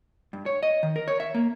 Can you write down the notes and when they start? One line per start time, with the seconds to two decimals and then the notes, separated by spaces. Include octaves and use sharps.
0.33 G2
0.46 C#5
0.63 D#5
0.83 D#3
0.96 A#4
1.08 C#5
1.20 E5
1.35 A#3